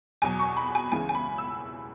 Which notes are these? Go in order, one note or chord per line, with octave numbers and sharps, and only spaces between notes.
E2 B2 F#3 G#5
C#6
B5
G#5
C#2 C#3 E3 G#5
G#5
B5
E6